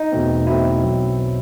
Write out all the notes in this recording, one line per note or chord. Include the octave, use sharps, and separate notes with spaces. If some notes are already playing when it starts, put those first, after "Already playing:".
Already playing: D#4
E2 B2 A3 C4
E2 B2 A3 C4 E4
B1 B2 F#3 C4
B2 F#3 C4